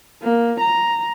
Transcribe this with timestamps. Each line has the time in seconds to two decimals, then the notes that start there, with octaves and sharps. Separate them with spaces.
0.23 A#3
0.61 A#5